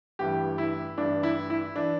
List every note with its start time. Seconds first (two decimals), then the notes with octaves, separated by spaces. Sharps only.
0.19 A1 G2 E3 G4
0.58 E4
0.97 A1 G2 E3 D4
1.23 E4
1.50 E4
1.76 E3 D4